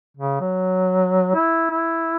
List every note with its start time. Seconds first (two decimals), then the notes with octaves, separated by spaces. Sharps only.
0.17 C#3
0.40 F#3
1.35 E4
1.70 E4